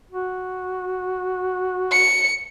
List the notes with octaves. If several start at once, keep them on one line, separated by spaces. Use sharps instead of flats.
F#4
C#7